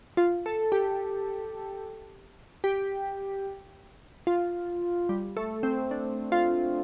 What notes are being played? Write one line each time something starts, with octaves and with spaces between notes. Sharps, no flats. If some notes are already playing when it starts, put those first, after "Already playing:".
F4
A4
G4
G4
F4
G3
A3
C4
D4
F4